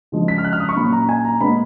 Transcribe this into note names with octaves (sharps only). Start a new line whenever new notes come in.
C#3 F3 G#3
B6
F6
F#6
F6
D#6
C#6
A#2 F#3 C#4 B5
A#5
G#5
A#5
A#2 G#3 B3 B5